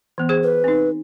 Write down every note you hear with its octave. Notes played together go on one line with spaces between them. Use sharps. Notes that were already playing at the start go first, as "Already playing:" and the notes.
E3 B3
G#4 C5
B4
C4 D#4